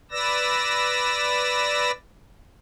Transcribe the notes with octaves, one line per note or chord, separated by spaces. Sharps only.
B4 D5 E6 A#6